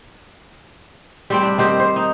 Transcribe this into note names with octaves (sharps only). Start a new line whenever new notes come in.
G3 C4 G5
D4
D#3 C4 G4
C5
D#4